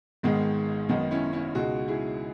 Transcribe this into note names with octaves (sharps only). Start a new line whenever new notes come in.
G#1 G#2 D#3 G#3 B3
G#1 F#2 D#3 B3 D#4
C#4 E4
C#4 E4
C#2 B2 G#3 D#4 F#4
E4 G#4